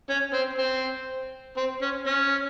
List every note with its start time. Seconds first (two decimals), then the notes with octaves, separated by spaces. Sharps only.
0.09 C#4
0.33 C4
0.58 C4
1.57 C4
1.82 C#4
2.06 C#4